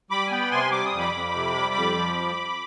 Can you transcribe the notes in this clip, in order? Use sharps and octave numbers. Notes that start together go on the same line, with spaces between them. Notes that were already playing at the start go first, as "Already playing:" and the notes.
G3 B5 D6
G#5
B3 G5 B5
C3 G#5 C6
G3 D6
D#6
F2
B5 D6
F2
C3
G3
F2
F3